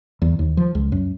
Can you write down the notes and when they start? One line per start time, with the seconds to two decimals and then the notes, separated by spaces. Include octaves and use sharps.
0.22 E2
0.39 D#2
0.57 F3
0.75 C#2
0.92 F#2